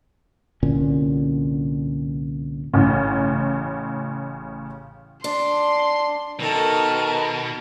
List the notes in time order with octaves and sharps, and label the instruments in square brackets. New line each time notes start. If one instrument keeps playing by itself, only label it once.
[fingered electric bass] C2 A#2 D3 C#4
[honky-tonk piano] A1 C#3
[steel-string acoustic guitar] D4 [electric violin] C6
[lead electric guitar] B2 [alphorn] D#3 [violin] A4 [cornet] A#4